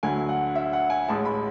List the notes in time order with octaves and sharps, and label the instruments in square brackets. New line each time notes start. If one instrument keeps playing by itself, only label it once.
[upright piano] D2 D3 F#3 A3 G#5
F#5
E5
F#5
G#5
A1 A2 G#3 A5
B5